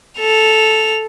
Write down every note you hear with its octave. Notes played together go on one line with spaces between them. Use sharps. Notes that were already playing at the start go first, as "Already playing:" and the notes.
A4 F7